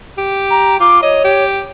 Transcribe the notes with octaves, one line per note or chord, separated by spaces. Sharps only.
G4
A#5
F4 D6
C#5 D#5
G4